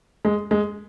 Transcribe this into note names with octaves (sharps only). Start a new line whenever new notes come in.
G#3
G#3